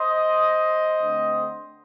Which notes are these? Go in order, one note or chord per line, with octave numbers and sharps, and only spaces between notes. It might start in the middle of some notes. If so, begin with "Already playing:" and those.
Already playing: C5 D#5
D3 A3 C4